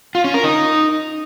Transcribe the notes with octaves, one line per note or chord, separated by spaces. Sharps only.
F4
C#4
A#4
D#4